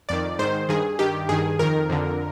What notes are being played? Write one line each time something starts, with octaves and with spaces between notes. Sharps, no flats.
F2 D#3 D5
G#2 D#3 C5
G2 D#3 G#4
G2 D#3 G4
G2 D#3 G#4
F2 D#3 A#4
F2 D3